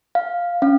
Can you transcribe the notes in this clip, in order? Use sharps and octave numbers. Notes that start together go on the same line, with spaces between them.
F5
C#4 F5